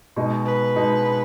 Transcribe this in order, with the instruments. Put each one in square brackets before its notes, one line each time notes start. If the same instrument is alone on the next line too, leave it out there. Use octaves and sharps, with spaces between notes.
[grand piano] B2 G#3 D#4
[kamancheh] B4
[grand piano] B2 G#3 D#4